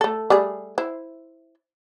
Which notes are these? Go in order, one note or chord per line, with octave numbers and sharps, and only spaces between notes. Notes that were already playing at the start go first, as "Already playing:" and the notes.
A3 A4
G3 A3 G#4
E4 C5